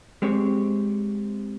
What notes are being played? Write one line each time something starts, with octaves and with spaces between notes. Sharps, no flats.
G#3 C4 G4 C#5